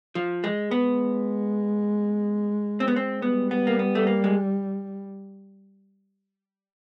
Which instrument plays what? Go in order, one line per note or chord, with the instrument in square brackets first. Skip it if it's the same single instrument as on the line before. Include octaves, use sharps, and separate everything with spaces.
[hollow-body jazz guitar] F3
G#3
[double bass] G#3 [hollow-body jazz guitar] B3
[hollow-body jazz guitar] C4
B3
C4
[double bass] G3 [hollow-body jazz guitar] B3
[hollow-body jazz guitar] B3
A#3
B3
A3
A#3
G#3